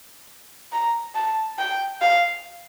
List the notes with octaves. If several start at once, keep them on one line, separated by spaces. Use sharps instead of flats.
A#5
A5
G5
F5